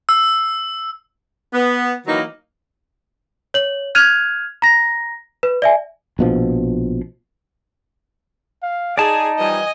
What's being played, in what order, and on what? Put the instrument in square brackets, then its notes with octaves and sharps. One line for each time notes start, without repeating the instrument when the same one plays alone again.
[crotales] E6
[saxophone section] B3
D#3 E3 F#3 A#3 D#4
[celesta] C#5 F#7
F6 F#6 G#6 D#7 F7
A#5 A#6
B4
D5 E5 G#5
[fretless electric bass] A#1 B2 F3
[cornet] F5
[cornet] D#4 [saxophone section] G#4 [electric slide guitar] D5 A5
[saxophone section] E3 F3 G3 [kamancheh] D#5 G#5